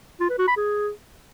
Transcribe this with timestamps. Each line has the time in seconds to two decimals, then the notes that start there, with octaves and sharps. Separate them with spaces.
0.20 F4
0.30 B4
0.39 F#4
0.48 B5
0.57 G#4